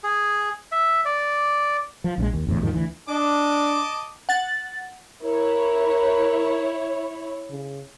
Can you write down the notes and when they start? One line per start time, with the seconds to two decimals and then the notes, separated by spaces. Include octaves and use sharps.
0.04 G#4
0.72 E5
1.05 D5
2.04 F3
2.18 A#1 D3 G#3
2.34 D#2
2.47 G1 E2 A2
2.62 D#2 G#2 D#3 F3
2.73 D2 E3
3.09 D4 D#5 A5 D6
4.29 F#5 A6
5.23 E4 A#4 C#5
7.51 C#3